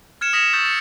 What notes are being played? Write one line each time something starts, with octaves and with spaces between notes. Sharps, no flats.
F6 G#6 C#7 E7
D#6 A#6 B6 C#7 E7 F7
C#6 E6 G6 A6
C#7